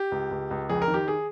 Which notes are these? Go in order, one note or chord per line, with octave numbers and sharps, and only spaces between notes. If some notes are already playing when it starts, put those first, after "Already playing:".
Already playing: G4
C#2
C#2
C#2
F2 G#4
A#4
D#3
G4
G#4